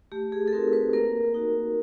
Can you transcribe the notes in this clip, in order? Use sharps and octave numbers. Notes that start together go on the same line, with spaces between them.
A3 G4
G#4
A4
C4 D#4 F#4 A#4
B4
A#3 A#4
D#4 F#4